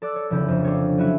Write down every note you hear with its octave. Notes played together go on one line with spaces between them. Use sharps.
A4 D5 D6 E6 F#6
C#5
F1 D2 C#3 E4 G6
F2
D4 F4 A4 C#5
F#3 C#4 E4 F#4 E5